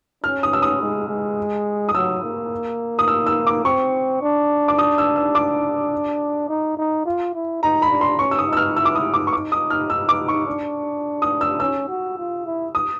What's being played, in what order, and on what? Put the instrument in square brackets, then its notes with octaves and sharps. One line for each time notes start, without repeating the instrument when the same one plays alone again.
[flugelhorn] C#4 [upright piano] F6
[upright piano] D#6
E6
D#6
[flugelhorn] G#3
G#3
[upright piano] D#6
[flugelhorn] F#3 [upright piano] E6
[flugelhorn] A#3
[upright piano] D#6
E6
E6
D6
[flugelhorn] C4 [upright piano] C#6
[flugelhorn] D4
[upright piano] D6
D#6
E6
E6
D6
[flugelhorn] D#4
D#4
F4
E4
[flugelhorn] D#4 [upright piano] A#5
[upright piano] B5
[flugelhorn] D4
[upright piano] C6
[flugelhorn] C#4 [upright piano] C#6
[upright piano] E6
D#6
[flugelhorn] D#4
[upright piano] E6
F6
[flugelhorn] E4 [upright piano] E6
[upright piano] D6
D#6
D6
C#6
[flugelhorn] D#4 [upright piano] D6
[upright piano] D#6
F6
E6
D6
C#6
[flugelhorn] D4
[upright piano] D#6
E6
[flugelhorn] C#4 [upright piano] E6
[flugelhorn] F#4
F4
E4
[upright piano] D#6